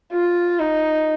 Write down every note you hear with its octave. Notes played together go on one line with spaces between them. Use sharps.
F4
D#4